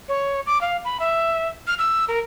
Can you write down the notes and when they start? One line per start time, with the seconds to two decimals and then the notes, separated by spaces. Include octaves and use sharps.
0.09 C#5
0.46 D6
0.61 F5
0.85 B5
1.00 E5
1.67 F6
1.79 E6
2.08 A#4